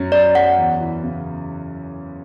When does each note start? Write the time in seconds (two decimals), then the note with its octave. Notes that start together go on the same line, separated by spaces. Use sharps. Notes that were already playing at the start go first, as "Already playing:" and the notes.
Already playing: F#2 F#3
0.12 F#3 D5
0.35 F#3 F#5
0.58 E2
0.81 E3
1.03 C#3